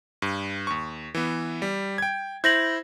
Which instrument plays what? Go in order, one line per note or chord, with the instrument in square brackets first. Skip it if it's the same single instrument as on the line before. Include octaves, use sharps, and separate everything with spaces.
[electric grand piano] G2
D#2 C#6
E3 B3
G3
G5 G#6
[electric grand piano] E4 C5 [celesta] G6 A#6 F#7